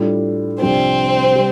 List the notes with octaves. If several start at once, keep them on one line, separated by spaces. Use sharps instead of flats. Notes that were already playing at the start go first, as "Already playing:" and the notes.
Already playing: A2 G3 D4 F4
C2 C3 F3 C4 D4 F4 C5
C3 G3